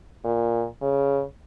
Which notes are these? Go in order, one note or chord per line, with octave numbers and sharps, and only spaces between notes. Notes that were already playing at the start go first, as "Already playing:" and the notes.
A#2
C#3